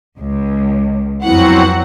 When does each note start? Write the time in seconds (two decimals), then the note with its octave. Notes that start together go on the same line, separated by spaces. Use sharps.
0.19 C#2
1.24 F2 F#3 B3 C4 E4 F#4 F#5